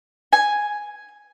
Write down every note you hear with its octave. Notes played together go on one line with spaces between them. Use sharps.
G#5